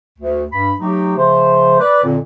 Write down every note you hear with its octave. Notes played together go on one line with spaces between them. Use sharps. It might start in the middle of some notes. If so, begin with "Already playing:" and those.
D2
G2 B5
F#3 A3 D#4 G4
C#3 F3 A3 C5
B4 D5
F2 A#2 D3